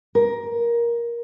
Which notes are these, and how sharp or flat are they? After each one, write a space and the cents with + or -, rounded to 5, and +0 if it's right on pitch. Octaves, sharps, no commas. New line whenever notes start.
A#4 +15